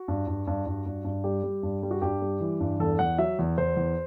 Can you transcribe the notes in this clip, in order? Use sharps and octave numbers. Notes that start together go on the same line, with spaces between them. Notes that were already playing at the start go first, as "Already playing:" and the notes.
Already playing: F#4
G2
G2
G2
G2
G2
G2
G3 G4
G3
G2
G3
F#4
G2 G4
G3
E3
G2
E2 A4
E2 F#5
F#3 E5
E2
E2 C5
E2